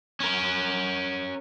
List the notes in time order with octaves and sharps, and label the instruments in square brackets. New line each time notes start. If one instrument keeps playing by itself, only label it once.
[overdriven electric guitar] C#4 A#4